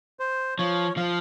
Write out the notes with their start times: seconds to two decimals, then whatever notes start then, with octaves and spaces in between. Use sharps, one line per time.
0.20 C5
0.58 F3 C#5
0.97 F3 F5